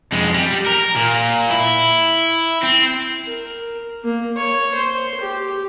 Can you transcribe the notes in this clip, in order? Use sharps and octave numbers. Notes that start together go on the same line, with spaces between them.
F2 G#3
G3
A#4
A#2
E4
C4
A#4
A#3
C#5
C5
G4